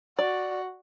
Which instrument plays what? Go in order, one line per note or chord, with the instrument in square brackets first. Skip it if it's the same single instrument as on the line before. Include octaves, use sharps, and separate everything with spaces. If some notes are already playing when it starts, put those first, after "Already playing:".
[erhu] F#4 [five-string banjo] D5